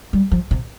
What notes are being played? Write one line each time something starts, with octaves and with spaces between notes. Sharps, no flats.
G3
F3
C3